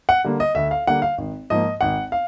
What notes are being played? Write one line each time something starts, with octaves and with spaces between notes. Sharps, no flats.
F#5
D3 G3 A#3
D#5
D2 E5
F5
D3 G3 A#3 F#5
F5
G#1
G#2 F3 A#3 D#5
G#1 F#5
F5